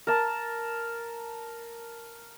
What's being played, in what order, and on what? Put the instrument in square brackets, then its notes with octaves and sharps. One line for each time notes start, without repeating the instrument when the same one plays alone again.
[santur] A#4 A5